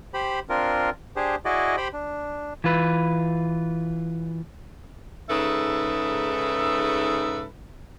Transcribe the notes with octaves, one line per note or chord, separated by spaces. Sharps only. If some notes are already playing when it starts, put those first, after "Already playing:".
G4 C5 B5
C4 D4 F4 A#4
D4 G4 G#4 C5
E4 F#4 G#4 D5 D#5
G4 C5 G5 B5
D4
E3 F4 B4
G#2 C#3 D#4 A4 B4 E5